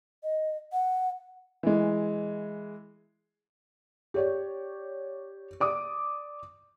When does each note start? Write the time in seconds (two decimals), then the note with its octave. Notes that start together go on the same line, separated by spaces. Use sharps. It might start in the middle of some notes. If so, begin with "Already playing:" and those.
0.23 D#5
0.72 F#5
1.63 E3 G#3
4.14 G4 C#5 D5
5.60 D5 D6 D#6